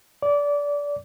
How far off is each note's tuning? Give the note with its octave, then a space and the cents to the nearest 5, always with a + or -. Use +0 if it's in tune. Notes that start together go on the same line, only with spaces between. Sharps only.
D5 -20